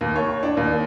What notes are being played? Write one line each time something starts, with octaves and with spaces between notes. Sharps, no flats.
D#2
C#5
D4
D#2